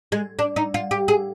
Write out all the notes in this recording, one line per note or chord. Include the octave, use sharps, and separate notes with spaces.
G#3
D4
D#4
F4
G4
G#4